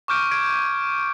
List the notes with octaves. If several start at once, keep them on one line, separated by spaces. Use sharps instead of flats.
C#6 D6 F6 G6 D7
F6 G#6 D7